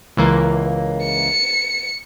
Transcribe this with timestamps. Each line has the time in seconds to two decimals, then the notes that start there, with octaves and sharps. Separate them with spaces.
0.17 C#2 E3 A#3
1.05 C#7